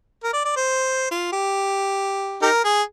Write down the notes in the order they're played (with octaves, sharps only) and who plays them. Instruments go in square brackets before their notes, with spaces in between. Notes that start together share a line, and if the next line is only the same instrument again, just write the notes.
[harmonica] A#4
D5
D5
C5
F4
G4
D#4 G4 A#4
G#4